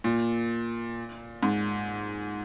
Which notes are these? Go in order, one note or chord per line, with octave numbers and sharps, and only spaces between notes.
A#2
G#2